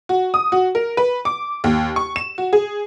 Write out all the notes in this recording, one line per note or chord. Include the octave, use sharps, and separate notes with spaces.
F#4
D#6
F#4
A#4
B4
D6
D#2
C#6
E7
F#4
G#4